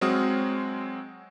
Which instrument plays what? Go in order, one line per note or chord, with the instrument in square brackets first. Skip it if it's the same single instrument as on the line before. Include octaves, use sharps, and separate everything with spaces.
[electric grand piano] F#3 G#3 C4 F#4 D#6 F6